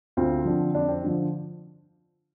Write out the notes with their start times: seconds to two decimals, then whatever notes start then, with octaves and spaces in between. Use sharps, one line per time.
0.17 D2 C4 F4
0.45 D3 F3
0.75 F2 D4
0.88 C4
1.03 D3 F3